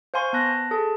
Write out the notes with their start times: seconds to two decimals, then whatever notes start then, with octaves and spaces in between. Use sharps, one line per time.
0.14 C5 F5 G#5 C6 C#6
0.33 B3 A5 F#6 A#6
0.71 G#4 A4 A5